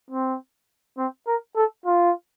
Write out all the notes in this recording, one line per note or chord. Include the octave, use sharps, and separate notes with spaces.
C4
C4
A#4
A4
F4